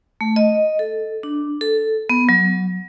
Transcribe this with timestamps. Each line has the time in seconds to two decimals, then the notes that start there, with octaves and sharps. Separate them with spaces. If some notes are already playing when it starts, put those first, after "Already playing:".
0.21 A3
0.36 D#5
0.79 A4
1.23 D4
1.61 A4
2.10 B3
2.29 F#3